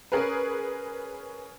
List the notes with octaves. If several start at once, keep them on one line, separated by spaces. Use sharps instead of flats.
C#4 G#4 A#4 B4